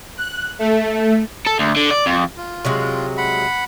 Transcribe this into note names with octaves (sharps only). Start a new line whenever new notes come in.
F#6
A3
A4
D2
D3
D5
F2
F4
C3 F#3 G#3
F#5 B5